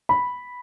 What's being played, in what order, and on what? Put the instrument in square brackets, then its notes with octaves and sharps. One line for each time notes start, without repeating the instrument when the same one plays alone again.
[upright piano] B5